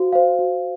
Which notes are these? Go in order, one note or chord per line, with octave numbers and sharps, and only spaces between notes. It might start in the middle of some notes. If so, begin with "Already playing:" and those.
Already playing: F#4 C5 F5
C5 F5
F#4